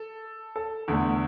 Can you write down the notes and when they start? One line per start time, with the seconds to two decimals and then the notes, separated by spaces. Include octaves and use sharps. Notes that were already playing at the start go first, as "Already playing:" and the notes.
Already playing: A4
0.56 A4
0.88 E2 D3 A3